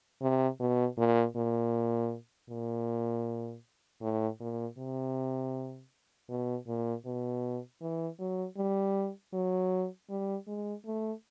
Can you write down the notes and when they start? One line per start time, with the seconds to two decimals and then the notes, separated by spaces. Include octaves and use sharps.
0.22 C3
0.60 B2
0.98 A#2
1.36 A#2
2.50 A#2
4.02 A2
4.40 A#2
4.78 C3
6.30 B2
6.68 A#2
7.06 B2
7.81 E3
8.20 F#3
8.57 G3
9.33 F#3
10.10 G3
10.48 G#3
10.86 A3